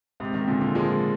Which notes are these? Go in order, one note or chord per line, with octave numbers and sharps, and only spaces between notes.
G#2 C3
C3 D#3
A#2 D3
A#2 D3
F3 G#3